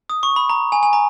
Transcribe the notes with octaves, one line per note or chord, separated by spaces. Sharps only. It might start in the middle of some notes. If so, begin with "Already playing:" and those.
D#6
C#6
B5
A#5
G#5
G#5
A#5